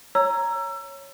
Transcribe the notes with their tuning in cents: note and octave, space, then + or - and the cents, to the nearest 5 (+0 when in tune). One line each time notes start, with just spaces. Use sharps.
C#5 +0 A#5 +0 E6 +30